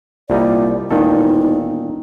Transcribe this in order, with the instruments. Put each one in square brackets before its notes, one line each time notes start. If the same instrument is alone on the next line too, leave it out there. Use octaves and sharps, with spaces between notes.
[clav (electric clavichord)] C2 G3 D#4 [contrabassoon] A#2 [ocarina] D5
[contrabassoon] E1 [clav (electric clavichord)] A#2 D#3 A4 [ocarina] D#4